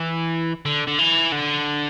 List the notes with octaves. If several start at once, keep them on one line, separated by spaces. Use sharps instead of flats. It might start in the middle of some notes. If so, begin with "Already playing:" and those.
Already playing: E3
D3
D3
E3
D3